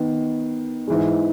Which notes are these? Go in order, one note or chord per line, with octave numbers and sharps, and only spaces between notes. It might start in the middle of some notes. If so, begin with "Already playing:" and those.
Already playing: D#3 B3
G#2 E3 G#3